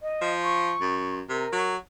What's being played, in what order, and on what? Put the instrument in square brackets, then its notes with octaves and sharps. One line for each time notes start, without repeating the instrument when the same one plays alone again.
[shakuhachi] D#5
[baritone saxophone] F3
[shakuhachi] C#6
[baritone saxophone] F#2
[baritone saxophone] C3 [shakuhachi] A#4
[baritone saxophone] F#3